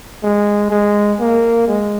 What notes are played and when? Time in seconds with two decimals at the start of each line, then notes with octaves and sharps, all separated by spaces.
0.23 G#3
0.71 G#3
1.20 A#3
1.68 G#3